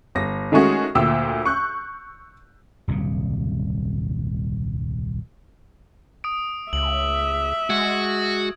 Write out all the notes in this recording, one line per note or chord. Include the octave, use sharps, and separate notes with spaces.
G1 A#6
D#3 G#3 A3 C#4 F#4 G#4
D2 A#2 G5 E6
C#6 F#6 G6
D#1 C2 F#2 C#3
D#6 D7
C#2 E5 F#7
G#3 F#4 G#6